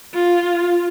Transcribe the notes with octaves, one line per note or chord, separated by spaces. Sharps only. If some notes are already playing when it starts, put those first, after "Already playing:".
F4